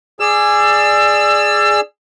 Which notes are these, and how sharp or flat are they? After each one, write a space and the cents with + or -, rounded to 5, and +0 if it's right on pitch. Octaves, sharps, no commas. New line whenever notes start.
G#4 +0 D5 +10 E6 +30